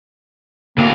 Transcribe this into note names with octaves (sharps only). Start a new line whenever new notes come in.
D2 A#3 F5